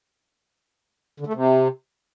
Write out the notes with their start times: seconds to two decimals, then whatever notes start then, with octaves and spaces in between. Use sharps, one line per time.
1.20 D3
1.27 A3
1.33 C3